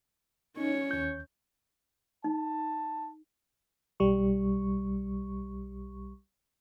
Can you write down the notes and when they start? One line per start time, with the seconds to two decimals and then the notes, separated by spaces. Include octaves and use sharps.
0.57 C#4 D#4 C#5
0.91 D#2 G6
2.24 D#4 A5
4.00 B1 G3 C#6